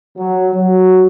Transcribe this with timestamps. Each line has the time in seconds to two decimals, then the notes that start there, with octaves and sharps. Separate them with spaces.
0.18 F#3
0.54 F#3